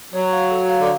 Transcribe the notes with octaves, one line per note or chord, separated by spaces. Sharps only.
F#3 C#5
F5
A4
F5
D3